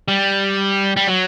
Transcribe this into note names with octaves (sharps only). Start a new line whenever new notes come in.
G3
G3
F#3